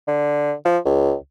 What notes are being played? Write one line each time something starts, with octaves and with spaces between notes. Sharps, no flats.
D3
F3
C#2